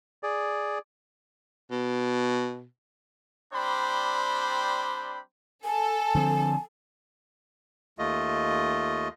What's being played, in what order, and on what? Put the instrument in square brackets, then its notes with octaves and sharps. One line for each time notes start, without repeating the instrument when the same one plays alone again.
[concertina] G#4 D5
[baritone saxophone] B2
[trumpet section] G3 C4 D4 C5 B5
[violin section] A4 [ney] G#5
[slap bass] D3 F3 C4
[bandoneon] D#2 A3 F4 D#5